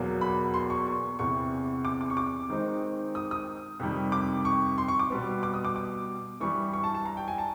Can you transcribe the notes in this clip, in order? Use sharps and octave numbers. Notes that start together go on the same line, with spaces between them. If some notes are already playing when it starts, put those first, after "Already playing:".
Already playing: E2 B2 F#3 A#3
B5
C6
C#6
C#6
E2 C3 E3 C#6
D6
D6
C#6
D6
D#3 G#3 C4 D#4
D#6
D#6
F2 C3 D#3 G3
D6
C#6
C6
C#6
D6
B2 G3 B3
D6
D#6
D6
D6
G2 E3 G3 C#6
C#6
A5
A5
A#5
G5
G#5
A5